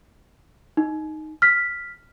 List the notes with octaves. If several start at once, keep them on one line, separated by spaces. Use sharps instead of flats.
D#4
F6 B6